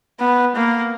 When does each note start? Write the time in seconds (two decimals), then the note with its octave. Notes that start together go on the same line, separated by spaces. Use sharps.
0.20 B3
0.56 A#3